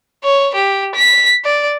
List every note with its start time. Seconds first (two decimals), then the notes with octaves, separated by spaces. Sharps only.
0.24 C#5
0.55 G4
0.95 B6
1.45 D5